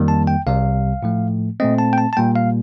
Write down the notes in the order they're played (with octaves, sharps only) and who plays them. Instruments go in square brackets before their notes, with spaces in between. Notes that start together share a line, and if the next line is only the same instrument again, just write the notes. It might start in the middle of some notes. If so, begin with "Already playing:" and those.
Already playing: [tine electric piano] F2 D#3 G3 A#3
A5
G5
C2 C3 G3 F5
A2 F3 A3
A#2 A3 C4 D#5
A5
G5
A5
A5
A#2 G3 A#3 G5
F5